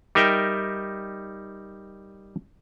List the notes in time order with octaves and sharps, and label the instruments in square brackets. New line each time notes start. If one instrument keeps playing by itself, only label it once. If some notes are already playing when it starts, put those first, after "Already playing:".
[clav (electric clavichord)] G3 D#4 A#4 E5 G5